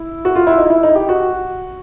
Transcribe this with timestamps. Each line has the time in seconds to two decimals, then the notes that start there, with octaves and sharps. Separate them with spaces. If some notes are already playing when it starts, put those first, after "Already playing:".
Already playing: E4
0.25 F#4
0.36 F4
0.47 E4
0.58 D#4
0.70 E4
0.83 D#4
0.96 G4
1.09 F#4